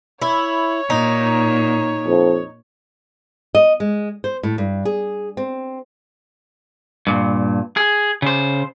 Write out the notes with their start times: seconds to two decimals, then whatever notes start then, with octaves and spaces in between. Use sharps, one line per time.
0.21 E4 C#5
0.90 A#2 D#4
2.07 F2
3.55 D#5
3.80 G#3
4.24 C5
4.43 A2
4.58 G2
4.85 G#4
5.37 C4
7.07 G2 A#2
7.77 G#4
8.22 C#3 C5